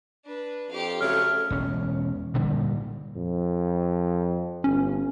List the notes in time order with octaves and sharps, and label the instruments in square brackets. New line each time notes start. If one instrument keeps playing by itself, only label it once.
[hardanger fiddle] D4 B4
[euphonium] F2 [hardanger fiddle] G4 F5
[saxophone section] C#3 F#3 A3 [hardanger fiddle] C#5 [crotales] F6
[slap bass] E1 C#4
G2 A#2 D3 G3
[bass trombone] F2
[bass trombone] G1 [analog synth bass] C#4